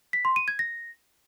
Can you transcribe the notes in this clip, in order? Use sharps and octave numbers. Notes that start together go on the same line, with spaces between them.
B6
C6
D#7
G#6
A#6